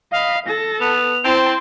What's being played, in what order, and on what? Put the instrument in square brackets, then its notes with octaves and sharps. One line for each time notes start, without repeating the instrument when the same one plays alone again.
[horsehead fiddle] D#5 B5 [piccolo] F5
[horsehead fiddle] A4 A5 [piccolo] A#6
[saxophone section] B3 [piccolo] F7
[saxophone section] C4 [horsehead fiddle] E4 [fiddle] A5 C6